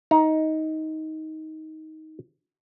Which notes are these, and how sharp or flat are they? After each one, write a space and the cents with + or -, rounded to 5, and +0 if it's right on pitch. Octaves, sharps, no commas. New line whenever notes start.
D#4 +15 A#5 +15